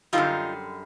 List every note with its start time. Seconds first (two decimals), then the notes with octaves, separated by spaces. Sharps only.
0.13 F#2 D3 G3 D#4 F4